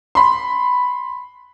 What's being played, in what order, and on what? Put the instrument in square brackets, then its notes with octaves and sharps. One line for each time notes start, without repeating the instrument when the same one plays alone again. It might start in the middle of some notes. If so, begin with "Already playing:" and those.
[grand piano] B5 C6